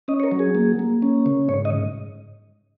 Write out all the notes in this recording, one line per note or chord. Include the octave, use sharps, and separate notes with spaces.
C#4 D#5
C#5
A#4
F#3
G#4
A#3
A#3
C#4
C#3
G#2 C#5
D#5